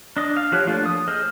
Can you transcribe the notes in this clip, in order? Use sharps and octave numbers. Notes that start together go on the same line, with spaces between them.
D4 D#5
F5
F3 F#4 G4 C#5 F#6
F3 A3 A#3 D4 F4
D#6
G#4 C5 D#5 F6